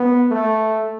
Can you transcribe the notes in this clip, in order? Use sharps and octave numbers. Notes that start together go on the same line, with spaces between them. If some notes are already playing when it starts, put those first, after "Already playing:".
Already playing: B3
A3